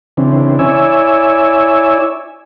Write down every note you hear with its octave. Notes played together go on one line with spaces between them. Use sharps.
C#3 E3 C4 D4
E4 C#5 D5 G#5 E6